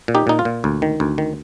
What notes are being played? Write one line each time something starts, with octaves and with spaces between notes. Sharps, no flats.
A#2
D#4 G4
A#2 D#4
F4
A#2
D2
D#3
D2
D#3